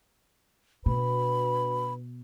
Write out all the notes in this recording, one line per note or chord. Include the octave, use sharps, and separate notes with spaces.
B2 D4 F#4 B4 B5